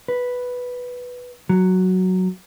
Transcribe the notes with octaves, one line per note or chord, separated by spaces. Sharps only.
B4
F#3